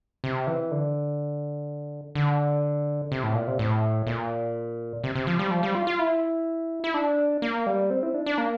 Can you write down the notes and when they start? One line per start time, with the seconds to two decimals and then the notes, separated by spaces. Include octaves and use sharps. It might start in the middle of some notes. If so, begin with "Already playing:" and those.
0.24 C3
0.47 E3
0.72 D3
2.15 D3
3.12 C3
3.23 A2
3.35 A#2
3.47 C3
3.59 A2
4.07 A#2
5.04 C3
5.16 C3
5.27 F3
5.39 G3
5.51 F3
5.63 G3
5.75 F4
5.87 F4
5.99 E4
6.84 E4
6.94 D4
7.42 A#3
7.66 G3
7.90 C4
8.03 E4
8.14 D4
8.26 D4
8.38 A#3